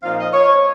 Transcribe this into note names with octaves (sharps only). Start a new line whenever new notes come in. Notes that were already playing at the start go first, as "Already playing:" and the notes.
A#2 F3 C4 D#4 F5
D#5
C#5